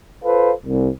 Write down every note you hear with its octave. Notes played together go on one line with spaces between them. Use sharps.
F4 A4 B4 C5 F5
C2